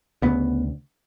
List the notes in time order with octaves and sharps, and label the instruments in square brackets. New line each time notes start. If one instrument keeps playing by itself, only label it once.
[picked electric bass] D2 C#3 B3